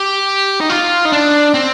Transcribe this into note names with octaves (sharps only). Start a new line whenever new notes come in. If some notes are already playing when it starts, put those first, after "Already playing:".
Already playing: G4
D#4
F4
D#4
D4
C4